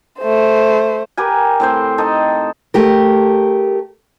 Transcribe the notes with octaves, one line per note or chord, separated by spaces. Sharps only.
A3 C5
G4 A#4 B4 G#5
A2 C4 C5
D#4 A4 D#5
A3 G4 A#4